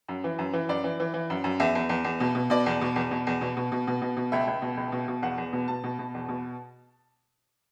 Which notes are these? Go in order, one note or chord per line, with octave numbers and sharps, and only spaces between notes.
F#2
E3
F#2
E3
F#2 D5
E3
E3
E3
F#2
F#2
E2 E5
E2
E2
E2
B2
B2
B2 D5
E2
B2
E2
B2
E2
B2
B2
B2
B2
B2
B2
C#2 E5
C#2
B2
C#2
B2
B2
E2 F#5
E2
B2
B2 A5
B2
B2
E2
B2